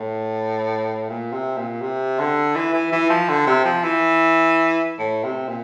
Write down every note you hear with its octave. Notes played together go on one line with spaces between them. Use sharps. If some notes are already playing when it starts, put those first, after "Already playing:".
Already playing: A2
A#2
C3
A#2
C3
D3
E3
E3
E3
F3
D3
C3
F3
E3
A2
C3
A#2